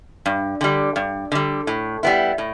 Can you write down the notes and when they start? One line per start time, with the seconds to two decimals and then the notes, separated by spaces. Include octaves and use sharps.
0.26 G2
0.61 D3 G3
0.96 G2
1.32 D3 G3
1.67 A2
2.03 G3 B3 E4
2.38 A2